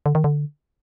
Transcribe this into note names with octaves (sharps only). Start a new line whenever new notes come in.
D3
D#3
D3